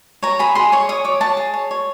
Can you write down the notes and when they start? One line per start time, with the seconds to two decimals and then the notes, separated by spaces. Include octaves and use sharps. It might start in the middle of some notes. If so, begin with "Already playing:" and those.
0.23 C#5 A#5
0.39 G#4 B5
0.55 G#4 C6
0.72 C#5 C#6
0.89 C#5 D#6
1.05 C#5 D6
1.21 C#5 A5
1.37 G#4
1.54 C#5
1.71 C#5